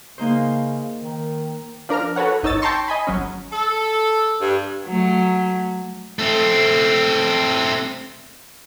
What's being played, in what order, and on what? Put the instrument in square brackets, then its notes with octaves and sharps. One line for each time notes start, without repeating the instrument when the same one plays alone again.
[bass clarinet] C#3 [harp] A#3 D#4 C5
[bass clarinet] D#3
[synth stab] F3 D4 A#4 A#5 F6
F#4 A4 B4 C#5 F#5
G#1 D#4 C#5 E6 A6
G5 A5 A#5 C6 C#6
D#5 G#5 B5
G#1 F#3 C#4
[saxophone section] A4
G2
[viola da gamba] F#3 A3
[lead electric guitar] A3 C4